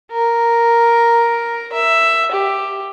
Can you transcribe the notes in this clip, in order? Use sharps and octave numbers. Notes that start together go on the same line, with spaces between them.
A#4
E5
G4